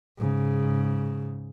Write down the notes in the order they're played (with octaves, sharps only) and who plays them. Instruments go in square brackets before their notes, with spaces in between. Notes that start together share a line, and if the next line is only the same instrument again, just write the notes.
[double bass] G#2 C#3